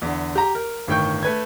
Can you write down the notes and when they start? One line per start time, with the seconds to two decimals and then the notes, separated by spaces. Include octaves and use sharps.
0.02 E2 D3
0.36 G4 A#5
0.55 A#4
0.87 G1 A2 D#3 G5 C#6 G6
1.23 A3 B4 G#6